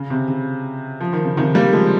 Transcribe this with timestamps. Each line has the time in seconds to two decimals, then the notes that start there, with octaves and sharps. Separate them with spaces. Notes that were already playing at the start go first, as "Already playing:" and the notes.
Already playing: C#3
0.10 C3
0.28 C#3
1.00 F3
1.13 D#3
1.25 C#3
1.37 C3 D#3
1.54 G3 A#3
1.73 F3 G#3